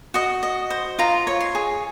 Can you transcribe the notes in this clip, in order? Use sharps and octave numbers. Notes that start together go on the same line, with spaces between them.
F#4 D#5
D#5
C5
F4 A#5
C#5
C6
G#4